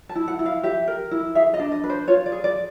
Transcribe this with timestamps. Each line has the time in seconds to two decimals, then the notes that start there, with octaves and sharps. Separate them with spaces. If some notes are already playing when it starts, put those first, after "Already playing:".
0.09 A5
0.16 E4
0.28 F#5
0.39 E4
0.46 F5
0.63 G4 E5
0.88 A#4
1.11 E4
1.35 G#4 E5
1.54 D#5
1.59 D4
1.72 D#5
1.84 B4
1.90 C5
2.08 F4 C#5
2.26 D5
2.32 G#4
2.44 D5